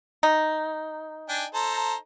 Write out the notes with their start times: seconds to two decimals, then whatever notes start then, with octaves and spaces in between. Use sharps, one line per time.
0.23 D#4
1.29 D4 G5 G#5
1.54 A4 C5 A#5